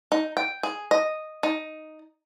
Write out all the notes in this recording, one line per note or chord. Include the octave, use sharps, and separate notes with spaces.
D#4
G5
G#4
D#5
D#4